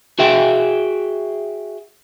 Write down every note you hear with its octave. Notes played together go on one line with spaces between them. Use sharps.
F#4 G#4 E5 G5